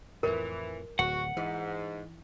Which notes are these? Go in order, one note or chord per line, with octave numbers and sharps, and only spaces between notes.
F2 A2 E3 A#4
D1 F#4 F#5
G#2 E3